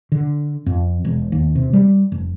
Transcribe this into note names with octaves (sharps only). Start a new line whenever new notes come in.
D3
F2
E1
D#2
C3
G3
F1